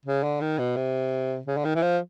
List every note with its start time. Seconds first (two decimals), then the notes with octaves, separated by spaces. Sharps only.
0.05 C#3
0.23 D3
0.41 D#3
0.59 B2
0.76 C3
1.47 C#3
1.57 D3
1.65 D#3
1.75 E3
1.82 F3